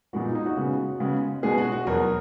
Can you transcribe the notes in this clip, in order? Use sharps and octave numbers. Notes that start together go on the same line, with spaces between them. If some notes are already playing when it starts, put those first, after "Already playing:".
A#2 G#3 B3 F#4
D#4
D#4
F#4
C#3 G#3 B3
C#3 G#3 B3
B2 G#3 B3 G#4
F#4
F#4
E2 B2 F#3 A#4